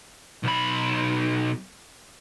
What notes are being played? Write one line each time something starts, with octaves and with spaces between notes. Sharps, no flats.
B1 B5